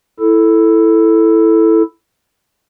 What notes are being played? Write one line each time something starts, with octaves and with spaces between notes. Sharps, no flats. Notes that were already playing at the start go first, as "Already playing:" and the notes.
E4 A4